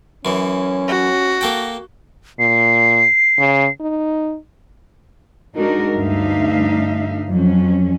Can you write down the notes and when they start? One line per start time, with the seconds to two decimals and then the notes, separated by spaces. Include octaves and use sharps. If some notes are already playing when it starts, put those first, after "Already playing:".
0.25 F#2 E3 C#4
0.88 F#4
1.41 A#3 A4 G5
2.39 A#2 C7
3.39 C#3
3.80 D#4
5.54 G#3 D4 D#4 F#4 A#4
5.94 D2 G2 D4 D#4 E5 F5
7.29 F2 F#3 C#4